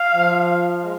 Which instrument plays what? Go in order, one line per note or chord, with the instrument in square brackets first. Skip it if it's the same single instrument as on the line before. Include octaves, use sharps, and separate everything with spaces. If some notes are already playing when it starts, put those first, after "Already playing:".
Already playing: [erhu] F5
[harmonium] F3
G#3